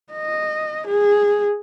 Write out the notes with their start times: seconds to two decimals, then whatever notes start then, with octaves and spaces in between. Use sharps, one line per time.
0.13 D#5
0.87 G#4